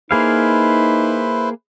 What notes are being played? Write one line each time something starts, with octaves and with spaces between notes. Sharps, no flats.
A#3 D#4 E4 G#4 B4 C5 F5